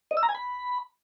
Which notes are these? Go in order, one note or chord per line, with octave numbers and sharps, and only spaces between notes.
D#5
E6
A#5
G#5
B5